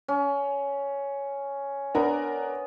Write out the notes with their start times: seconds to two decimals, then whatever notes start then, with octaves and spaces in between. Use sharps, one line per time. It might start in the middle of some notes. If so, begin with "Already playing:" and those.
0.08 C#4
1.95 B3 D4 A#4